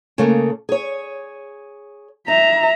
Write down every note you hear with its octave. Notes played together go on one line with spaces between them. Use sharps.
C#3 A3 A#3
G#4 C#5
D#4 E5 A#5